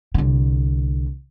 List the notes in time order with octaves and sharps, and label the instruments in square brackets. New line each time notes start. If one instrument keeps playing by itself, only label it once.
[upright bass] C2 D3